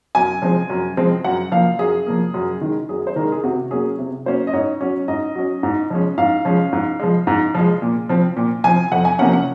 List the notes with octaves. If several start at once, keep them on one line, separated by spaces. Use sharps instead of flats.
F#2 G#5
F3 G#3 C4
F#2
F3 G#3 C4
F#2 F#5
F3 A#3 F5
F#2 G#4
F3 A#3
F#2
D#3 G#3
F#2 G#4
C5
D#3 G#3 A#4
G#4
C3 F#4
F#3 A#3 C#4 G#4
C3
F#3 A#3 C#4 C5
D#5
G#2 C#5
F#3 C#4
G#2 D#5
F#3 C#4
G#2
F3 G#3 C#4
G#2 F5
F3 G#3 C#4
G#2
F3 G#3
G#2
F3 G#3
A#2
F3 C4
A#2
F3 C4 G#5
F2 F#5
G#5
C3 F3 A#3 C#4 F#5
F#5